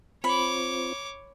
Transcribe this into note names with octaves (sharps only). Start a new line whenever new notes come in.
C4 F4 C5 C#5 B5 D6